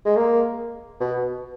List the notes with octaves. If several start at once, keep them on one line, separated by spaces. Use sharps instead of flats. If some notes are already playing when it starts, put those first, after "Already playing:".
G#3
A#3
B2